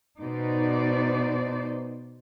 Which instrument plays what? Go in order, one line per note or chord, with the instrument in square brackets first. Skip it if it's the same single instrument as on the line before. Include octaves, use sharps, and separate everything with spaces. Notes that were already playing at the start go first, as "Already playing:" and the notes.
[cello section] B2 D#4 C5 D5